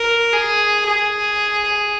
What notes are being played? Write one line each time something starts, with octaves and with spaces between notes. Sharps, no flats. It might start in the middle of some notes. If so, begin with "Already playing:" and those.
Already playing: A#4
G#4
G#4